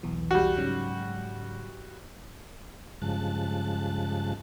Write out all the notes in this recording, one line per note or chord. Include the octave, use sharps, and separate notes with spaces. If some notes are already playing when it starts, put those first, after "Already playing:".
B1 E2 E3
G3 F#4
G#2 C#3 F#3
G2 C#3 F3 G#3 A5 F#6